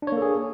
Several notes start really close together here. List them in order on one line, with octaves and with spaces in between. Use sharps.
D4 C#5 A#3 A4 G#4